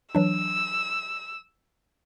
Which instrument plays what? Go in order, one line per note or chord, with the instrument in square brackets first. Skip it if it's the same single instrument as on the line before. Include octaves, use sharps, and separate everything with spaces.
[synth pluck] E3 F#3 D4 [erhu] E6